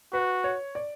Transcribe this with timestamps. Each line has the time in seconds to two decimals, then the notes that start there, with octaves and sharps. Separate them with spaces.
0.13 F#4 B4
0.44 C#5
0.75 D5